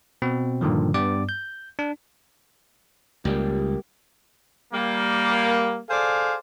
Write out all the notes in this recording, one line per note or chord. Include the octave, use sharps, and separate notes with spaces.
B2 C4
G2 A#2 D3 D#3 F3
G2 G3 B3 D5 D6
G6
D4
C#2 G3 A#3 G4
G3 A#3
G#4 A4 C5 D5 F5